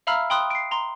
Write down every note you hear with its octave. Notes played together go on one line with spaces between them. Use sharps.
E5 F5 A#5 B5 E6 F6
G5 B5 C6 D#6 F#6
C7 D7
A#5 C6